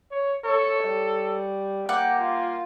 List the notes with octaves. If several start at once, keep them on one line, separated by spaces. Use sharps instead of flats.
C#5
A4 C#5
G3
A#3 F#5 G5 D6
F4